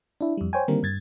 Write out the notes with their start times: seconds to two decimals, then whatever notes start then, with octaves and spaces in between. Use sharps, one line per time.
0.21 D4 E4
0.37 F2 G3
0.53 C5 C#5 G5 G#5
0.68 D3 D#3 G3 A#3 C4 A#4
0.83 G2 G#6 A6